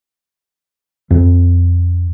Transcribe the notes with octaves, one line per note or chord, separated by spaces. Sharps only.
F2 C4